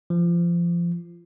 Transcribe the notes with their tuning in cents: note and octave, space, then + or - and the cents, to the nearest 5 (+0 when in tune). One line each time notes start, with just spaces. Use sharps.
F3 -25